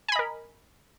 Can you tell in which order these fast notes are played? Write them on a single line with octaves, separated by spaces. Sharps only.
G#5 B5 D#5 A#4